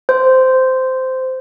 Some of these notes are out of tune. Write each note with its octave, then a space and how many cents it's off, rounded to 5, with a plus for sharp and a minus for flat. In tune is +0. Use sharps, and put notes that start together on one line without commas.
C5 -10